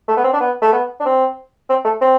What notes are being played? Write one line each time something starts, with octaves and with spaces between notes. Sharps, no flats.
A3
B3
C4
D4
B3
A3
B3
D4
C4
C4
A3
C4